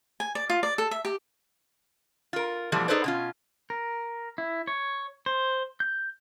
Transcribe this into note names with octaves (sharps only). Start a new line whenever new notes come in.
G#5
D5
F4
D5
A4
E5
G4
F4 A#4
B2 E3 F3 G3 A3
D#4 G#4 A4 B4 C5 D5
B2 C#4 F4
A#4
E4
C#5
C5
G6